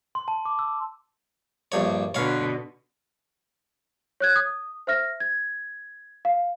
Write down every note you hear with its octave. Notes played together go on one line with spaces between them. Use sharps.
C6
A5
D6
E6
A#1 G2 C#5
B2 D3 C#5 F5
C#5 F#6 G#6
D#6
C5 E5 F6 A#6
G#6
F5